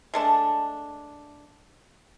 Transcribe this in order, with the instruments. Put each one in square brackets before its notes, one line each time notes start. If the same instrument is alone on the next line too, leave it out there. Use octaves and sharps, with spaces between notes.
[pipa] G#3 A3 D4